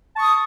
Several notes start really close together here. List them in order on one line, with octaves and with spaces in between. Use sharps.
A5 C#6 D#6